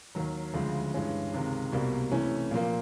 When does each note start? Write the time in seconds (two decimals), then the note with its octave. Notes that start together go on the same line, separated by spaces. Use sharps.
0.15 D#2 D#3 F#3
0.53 D2 C#3 F3 G#3
0.94 G2 E3 G#3 C#4
1.32 C#2 C3 D#3 G#3
1.72 C2 B2 G3 A#3
2.12 C3 E3 A3 C#4 E4
2.51 A#2 F3 A#3